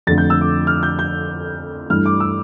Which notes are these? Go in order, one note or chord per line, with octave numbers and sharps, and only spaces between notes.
F2 D3 A3 A6
G6
E6
D6
F6
G6
G6
G2 E3 A3 F6
D6
E6